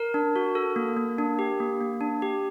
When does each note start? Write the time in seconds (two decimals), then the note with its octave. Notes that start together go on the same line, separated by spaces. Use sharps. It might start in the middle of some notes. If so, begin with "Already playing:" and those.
Already playing: A#4
0.14 D4
0.36 F#4
0.55 A4
0.76 A#3
0.97 A#3
1.18 D4
1.39 G4
1.60 A#3
1.81 A#3
2.01 D4
2.22 G4